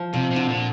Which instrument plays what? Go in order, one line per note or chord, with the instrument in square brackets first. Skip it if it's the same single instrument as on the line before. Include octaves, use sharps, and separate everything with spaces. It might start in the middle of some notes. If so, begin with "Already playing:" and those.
Already playing: [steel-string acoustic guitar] F3
[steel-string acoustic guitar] F2 [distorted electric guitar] C3
[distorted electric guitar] C3
[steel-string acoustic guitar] D3
[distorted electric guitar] A#2